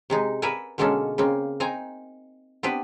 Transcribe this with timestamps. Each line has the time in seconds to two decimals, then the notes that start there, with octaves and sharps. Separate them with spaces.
0.10 C3 G#3 D#4
0.42 A#4 B4 D5 E5 F#5 G#5
0.78 B2 D3 G#3 A#3 C#4 A4
1.18 C#3 A#3 C4
1.60 C4 D#4 G#5 A#5
2.63 B3 C4 D4 G4 B4